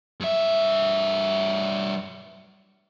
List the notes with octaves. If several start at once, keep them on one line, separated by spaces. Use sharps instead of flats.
G2 E5